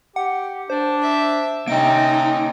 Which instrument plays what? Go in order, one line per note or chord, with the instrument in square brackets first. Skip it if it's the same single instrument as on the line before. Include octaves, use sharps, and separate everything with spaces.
[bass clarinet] G4 [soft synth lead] F#5
[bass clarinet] D4 [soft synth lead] C5
[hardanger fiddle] E5
[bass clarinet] C3 [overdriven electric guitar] A#3 G5 [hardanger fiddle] C#4 D#4 [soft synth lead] D7